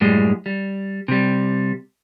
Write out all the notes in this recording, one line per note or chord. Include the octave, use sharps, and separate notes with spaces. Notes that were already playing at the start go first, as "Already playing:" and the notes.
F#2 A2 G3 G#3
G3
C3 G3